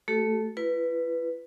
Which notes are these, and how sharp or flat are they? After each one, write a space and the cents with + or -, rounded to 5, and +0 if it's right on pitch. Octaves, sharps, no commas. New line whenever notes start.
A3 +0 F#4 +45 A4 -10
E4 +45 B4 +0